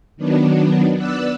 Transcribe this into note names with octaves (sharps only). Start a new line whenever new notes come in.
D#3 F#3 B3 D4
B3 D5 E6 F#6